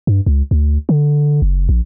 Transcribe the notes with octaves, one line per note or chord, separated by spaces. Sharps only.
G2
C#2
D2
D3
F#1
A#1